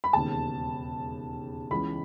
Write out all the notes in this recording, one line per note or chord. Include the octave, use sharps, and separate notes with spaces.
B5
E1 D#2 C#3 A5
C#2 C#3 E3 B5